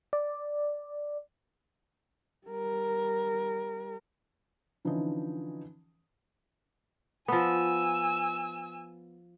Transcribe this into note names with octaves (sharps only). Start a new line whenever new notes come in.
D5
G3 A#4
D3 E3 F3 C#4 D#4
F3 B3 G#5 E6